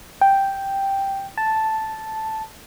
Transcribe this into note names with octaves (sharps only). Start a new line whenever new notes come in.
G5
A5